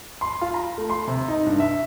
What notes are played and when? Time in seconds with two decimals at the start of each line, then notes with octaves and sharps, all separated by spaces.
0.21 C6
0.41 F4
0.54 A#5
0.78 A3
0.90 C6
1.08 C3
1.28 D#4
1.46 G2
1.60 E5